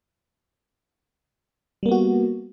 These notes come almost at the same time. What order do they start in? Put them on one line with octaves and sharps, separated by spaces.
G3 A#3 B3 F#4